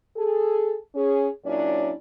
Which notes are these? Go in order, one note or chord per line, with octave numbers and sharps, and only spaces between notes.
G#4 A4
C#4 G#4
A#2 F#3 C#4 D4 E4 D5